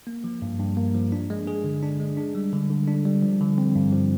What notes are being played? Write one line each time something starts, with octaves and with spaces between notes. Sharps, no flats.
A#3
F3
G2
G2
A#3
F3
D4
G#3
G#4
D3
D4
G#3
D4
G3
D3
D3
D4
G3
F3
D3
C4
G2
F3